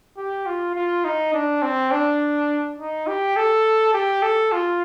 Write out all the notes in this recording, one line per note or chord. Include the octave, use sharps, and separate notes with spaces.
G4
F4
F4
D#4
D4
C4
D4
D#4
G4
A4
G4
A4
F4